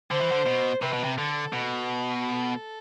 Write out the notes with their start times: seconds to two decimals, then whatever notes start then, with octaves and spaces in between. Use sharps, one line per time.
0.11 D3 C5
0.21 E3
0.32 D3
0.46 B2
0.82 C3 B4
0.93 B2
1.04 C3
1.18 D3 A4
1.53 B2
2.24 A4